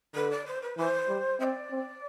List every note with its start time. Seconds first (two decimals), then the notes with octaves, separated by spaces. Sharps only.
0.14 D3 B4
0.30 D5
0.46 C5
0.62 B4
0.77 E3 C5
1.08 G3
1.39 C4 D5 E5
1.71 C4